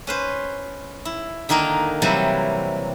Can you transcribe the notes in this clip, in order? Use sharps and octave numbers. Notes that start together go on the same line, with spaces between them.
C#4 B4 C5
E4
D3 D#3 A#3 D#4 A#4
C3 E3 F#3 G3 E4